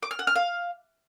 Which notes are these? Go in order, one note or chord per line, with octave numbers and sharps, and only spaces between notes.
D6
F6
F#5
F6
F5